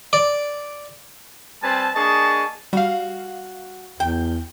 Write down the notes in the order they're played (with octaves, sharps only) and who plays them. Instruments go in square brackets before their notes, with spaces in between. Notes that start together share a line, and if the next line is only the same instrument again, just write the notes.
[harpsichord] D5
[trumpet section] G3 C4 B4 G#5 A5
A#3 D4 G#4 D#5 A5 C#6
[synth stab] G3 F5 [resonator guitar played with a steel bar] F#4
[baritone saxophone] E2 [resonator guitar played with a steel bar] G5